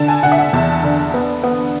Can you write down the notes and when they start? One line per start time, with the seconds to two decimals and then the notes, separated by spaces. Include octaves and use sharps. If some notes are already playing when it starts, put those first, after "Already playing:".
Already playing: D3 A5
0.08 G#5
0.23 D3 F#5
0.32 E5
0.38 F#5
0.53 E2 A5
0.83 D3
1.14 B3
1.43 B3